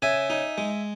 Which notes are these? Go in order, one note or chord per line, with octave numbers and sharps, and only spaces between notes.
C#3 E5 G#5
D#4
G#3